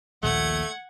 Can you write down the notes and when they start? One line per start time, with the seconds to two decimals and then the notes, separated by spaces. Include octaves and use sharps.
0.23 A#1 D#2 A#2 A3 F#5 G#6